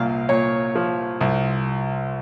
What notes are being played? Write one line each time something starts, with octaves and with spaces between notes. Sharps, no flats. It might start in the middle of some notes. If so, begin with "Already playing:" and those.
Already playing: C2 A#2 F5
A#2 C#5
F3
C2